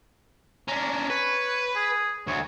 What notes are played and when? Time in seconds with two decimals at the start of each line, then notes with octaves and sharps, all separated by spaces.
0.68 C#4 D4 A#5
1.10 B4 C#5
1.76 G#4
2.27 D2 C#5